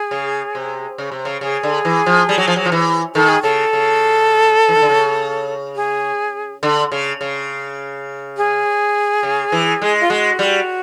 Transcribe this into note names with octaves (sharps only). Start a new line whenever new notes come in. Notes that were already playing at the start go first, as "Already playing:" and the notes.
Already playing: G#4
C#3
C3
C#3
C3
C#3
C#3 G#4
D3
E3
F3
G3
F#3
F3
F#3
F3
E3
D#3 A4
G#4
C#3 A4
C#3
E3
D#3
D3
C#3
G#4
D3
C#3
C#3
G#4
C#3
E3
G#3
F4
G#3 F#4
G3